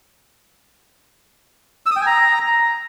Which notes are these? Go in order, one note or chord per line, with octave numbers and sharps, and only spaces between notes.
E6
D#6
G5
G#5
A#5